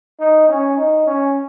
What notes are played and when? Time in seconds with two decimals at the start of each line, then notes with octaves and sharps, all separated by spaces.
0.20 D#4
0.49 C#4
0.78 D#4
1.07 C#4